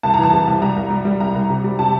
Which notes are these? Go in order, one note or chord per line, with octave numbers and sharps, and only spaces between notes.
C2 A5
A#5
E3 A5
C3
C2
G3 A#5
C2
G3
G3
C2 A#5
C2
C3
G3
C3 A5